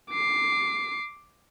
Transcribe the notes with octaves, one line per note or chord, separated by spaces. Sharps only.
D6 C7